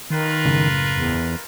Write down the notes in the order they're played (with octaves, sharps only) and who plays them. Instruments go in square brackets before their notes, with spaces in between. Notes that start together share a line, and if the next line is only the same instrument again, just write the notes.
[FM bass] D#3 [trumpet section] F4 A#4 B4
[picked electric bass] F#1 A2 C#3
[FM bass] E2